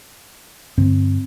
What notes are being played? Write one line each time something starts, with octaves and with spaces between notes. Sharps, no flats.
G2 D3 C4